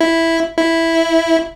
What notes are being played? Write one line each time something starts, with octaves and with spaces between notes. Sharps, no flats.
E4
E4